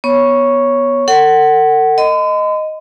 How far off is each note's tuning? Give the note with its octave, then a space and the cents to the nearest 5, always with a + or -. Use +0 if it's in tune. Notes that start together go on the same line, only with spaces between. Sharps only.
B3 -15 C#5 +0 C#6 +0
A4 +45 F#5 +25
D#5 +0 C6 -45